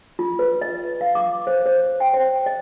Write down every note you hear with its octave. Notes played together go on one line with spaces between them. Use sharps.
F4
B4
D#5
F5
D6
C5
C5
G5
C5
D#5